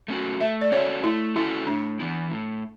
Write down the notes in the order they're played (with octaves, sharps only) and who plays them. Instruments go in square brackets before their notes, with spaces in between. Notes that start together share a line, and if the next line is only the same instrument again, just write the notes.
[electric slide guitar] A3 C#4 F#4
[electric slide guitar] A3 [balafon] E5
[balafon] D5
[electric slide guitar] C#4 F#4 A4 E5 [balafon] C#5
[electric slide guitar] A3 [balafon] E4
[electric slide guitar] C#4 F#4 A4 E5 [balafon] E4
[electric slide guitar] A2 [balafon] D4
[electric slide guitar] E3 B3 E4
A2